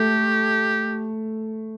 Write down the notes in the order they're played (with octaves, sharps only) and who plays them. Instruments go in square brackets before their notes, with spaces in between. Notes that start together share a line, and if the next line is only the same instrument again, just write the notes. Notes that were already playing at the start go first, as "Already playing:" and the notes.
Already playing: [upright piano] A3 [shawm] G4